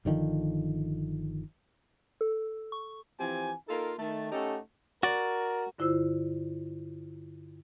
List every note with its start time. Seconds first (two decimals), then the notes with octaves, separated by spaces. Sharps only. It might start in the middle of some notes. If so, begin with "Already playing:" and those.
0.05 G1 D3 D#3 F3
2.21 A4
2.72 C#6
3.20 E3 F3 C4 G4 G#5
3.69 A#3 D#4 F4 A4 A#4
3.99 D#3 A3 A5
4.32 A3 C#4 D#4 G4 A4 F#5
5.03 F#4 A#4 D5
5.78 G2 D3 E4 F4 C5 E6